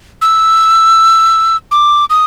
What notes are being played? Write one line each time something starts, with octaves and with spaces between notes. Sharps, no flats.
E6
D6
D#6